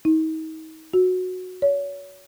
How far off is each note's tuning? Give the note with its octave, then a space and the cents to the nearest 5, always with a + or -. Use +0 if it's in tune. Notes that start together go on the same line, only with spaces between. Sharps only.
D#4 +35
F#4 -10
C#5 +35